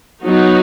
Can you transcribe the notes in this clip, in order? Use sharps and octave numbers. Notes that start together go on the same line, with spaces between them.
F#3 B3 D#4 F#4